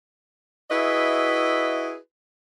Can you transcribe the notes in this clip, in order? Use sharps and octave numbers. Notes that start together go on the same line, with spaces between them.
E4 F#4 G#4 B4 D#5 E5